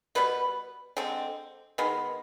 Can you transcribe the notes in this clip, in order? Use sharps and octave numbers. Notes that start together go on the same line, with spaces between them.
B2 G3 B3 B4
D3 G#3 C4
D#3 G#3 B3